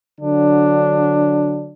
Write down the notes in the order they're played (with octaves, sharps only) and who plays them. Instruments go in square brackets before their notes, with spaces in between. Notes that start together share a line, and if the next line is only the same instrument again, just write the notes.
[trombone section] D3 F#3 D4